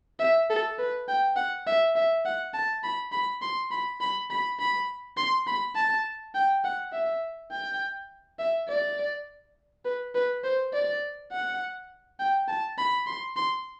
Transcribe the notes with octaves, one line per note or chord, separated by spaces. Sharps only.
E5
A4
B4
G5
F#5
E5
E5
F#5
A5
B5
B5
C6
B5
B5
B5
B5
C6
B5
A5
G5
F#5
E5
G5
E5
D5
B4
B4
C5
D5
F#5
G5
A5
B5
C6
C6